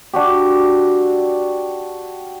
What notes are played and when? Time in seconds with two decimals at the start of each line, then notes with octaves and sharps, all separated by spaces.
0.13 D4 F#4 G4